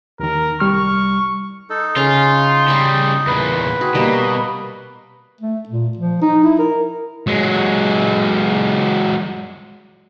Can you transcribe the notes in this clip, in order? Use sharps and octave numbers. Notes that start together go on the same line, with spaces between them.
D#2 D#3 A#4
C2 G3 C#6 F6
D#4 A4
C#3 C#4 F4 F5 C6
C#3 G3 B5 C#6
E2 A#2 B4
C4 F#4 G#4
B2 F#3 G3 A#3 D#5 D#6
A3
A#2
F3
D#4
E4
A#4
F#3 G#3